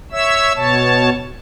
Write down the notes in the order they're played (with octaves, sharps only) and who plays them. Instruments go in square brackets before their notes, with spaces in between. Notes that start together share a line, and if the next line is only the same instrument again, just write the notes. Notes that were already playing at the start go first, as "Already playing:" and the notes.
[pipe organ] C#5 E5 E6
B2 C#5 A5